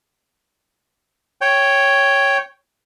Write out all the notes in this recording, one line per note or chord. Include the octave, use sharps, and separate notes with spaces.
C#5 G5